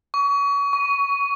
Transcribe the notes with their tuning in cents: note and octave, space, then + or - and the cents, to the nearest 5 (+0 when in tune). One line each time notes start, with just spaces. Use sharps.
C#6 +35
C#6 +20